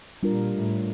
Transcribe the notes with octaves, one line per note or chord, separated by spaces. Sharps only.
A#2 G3 D4 F4 A#4
A2